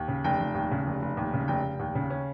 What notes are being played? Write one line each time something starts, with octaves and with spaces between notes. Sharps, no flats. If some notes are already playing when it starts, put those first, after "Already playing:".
Already playing: D#2
C#3
F1 G5
F1
D#2
C#3
F1
F1
D#2
C#3
F1 G5
F1
D#2
C#3
C#4